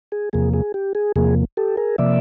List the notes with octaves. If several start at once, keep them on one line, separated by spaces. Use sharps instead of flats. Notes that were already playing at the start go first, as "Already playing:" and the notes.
G#4
E2 C3 F3 A#3 G#4
G#4
G4
G#4
E2 C3 F3 A#3 G#4
G4 A4
G#4 A#4
C3 F3 A#3 D5 E5